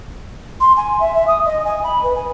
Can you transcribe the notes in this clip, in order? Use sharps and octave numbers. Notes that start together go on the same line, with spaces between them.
C6
G#5
E5
E5
D#6
D#5
G#5
B5
B4
G#5